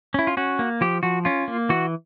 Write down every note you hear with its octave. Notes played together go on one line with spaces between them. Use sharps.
C#4 E4
F4
C#4 F#4
A#3
F3 G4
F3 F#4
C#4 F4
A#3
E3 F#4